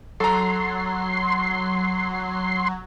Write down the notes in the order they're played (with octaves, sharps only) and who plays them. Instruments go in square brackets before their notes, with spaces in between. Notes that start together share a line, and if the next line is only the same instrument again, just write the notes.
[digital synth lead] F#3 [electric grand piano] A4 A#5 [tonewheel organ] C6